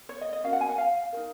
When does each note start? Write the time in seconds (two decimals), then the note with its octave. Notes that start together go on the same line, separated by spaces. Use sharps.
0.09 C#5
0.21 D#5
0.33 D#5
0.44 C#4 F#4 A#4 F5
0.53 F#5
0.61 G#5
0.69 F#5
0.78 F5
1.12 F#4 A#4
1.17 D#4